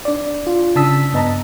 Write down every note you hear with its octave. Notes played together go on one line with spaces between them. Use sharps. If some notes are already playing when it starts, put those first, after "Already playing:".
D4 D5
F4
C#3 D4 A5 D#6 E6 B6
G2 B3 D#5 A5 A#5